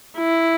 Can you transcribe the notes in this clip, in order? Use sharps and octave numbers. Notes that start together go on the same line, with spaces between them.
E4